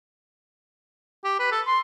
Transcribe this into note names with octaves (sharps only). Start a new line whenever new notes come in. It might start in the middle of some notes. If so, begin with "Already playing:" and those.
G4
B4
A4
C6